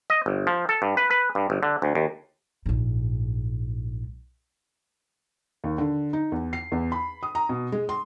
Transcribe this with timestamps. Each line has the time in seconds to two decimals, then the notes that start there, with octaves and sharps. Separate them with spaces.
0.10 D#5
0.26 G1
0.47 F3
0.69 A4
0.82 G2
0.97 B4
1.11 B4
1.35 G2
1.50 G1
1.63 D3
1.82 D2
1.95 D#2
2.66 A#1 G#2
5.64 D#2
5.78 D3
6.13 D#4
6.32 E2
6.53 C7
6.72 E2
6.92 B5
7.23 D#6
7.35 A#5
7.49 B2
7.72 G#3
7.89 C6